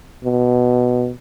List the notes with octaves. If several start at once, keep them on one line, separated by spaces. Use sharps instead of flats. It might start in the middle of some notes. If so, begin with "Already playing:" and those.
B2